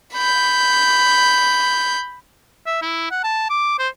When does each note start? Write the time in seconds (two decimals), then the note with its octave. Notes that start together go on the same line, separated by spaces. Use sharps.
0.14 B5 G6
2.66 E5
2.82 E4
3.11 F#5
3.24 A5
3.50 D6
3.79 C5